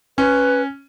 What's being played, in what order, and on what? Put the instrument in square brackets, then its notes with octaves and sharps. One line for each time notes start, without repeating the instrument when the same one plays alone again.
[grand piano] C#4 [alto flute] B4